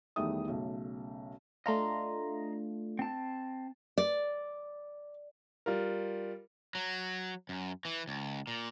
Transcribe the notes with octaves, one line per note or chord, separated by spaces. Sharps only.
E2 D#3 G3 A3 D#4 D#6
B1 C#3 A3
A3 D4 F4 D#5 A#5 C6
C4 A5
D5
G3 F4 A#4
F#3
F#2
E3
C#2
A#2